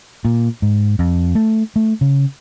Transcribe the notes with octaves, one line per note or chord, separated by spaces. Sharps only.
A#2
G#2
F2
A3
A3
C#3